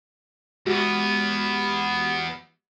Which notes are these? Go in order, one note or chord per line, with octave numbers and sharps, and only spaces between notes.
E2 G#3 B3 F#4 G4